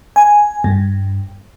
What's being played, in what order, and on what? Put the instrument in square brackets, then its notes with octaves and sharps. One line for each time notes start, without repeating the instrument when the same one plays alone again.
[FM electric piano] G#5
G2